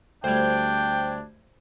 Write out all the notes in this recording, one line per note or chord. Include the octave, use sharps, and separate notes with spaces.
D2 G3 D4 C5 G5 G#6